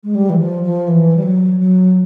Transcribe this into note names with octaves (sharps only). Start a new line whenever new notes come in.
G#3
G3
E3
F3
F3
E3
G3
F#3
F#3